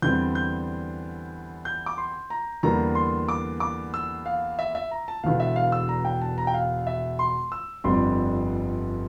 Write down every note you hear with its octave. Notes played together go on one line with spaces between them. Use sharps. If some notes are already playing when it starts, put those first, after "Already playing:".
E2 D3 G3 C4 G6
G6
G6
D6
C6
A#5
E2 D3 G3 A#3 A#5
C6
D6
D6
E6
F5
E5
E5
A#5
A5
E1 E2 D3 F5
E5
F5
E6
A#5
G5
A5
A#5
G5
F5
E5
C6
E6
G1 F2 D3 G3 C4 C6